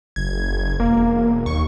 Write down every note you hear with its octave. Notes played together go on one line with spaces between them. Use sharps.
F#1 G#6
E1 A#3
D#2 C#6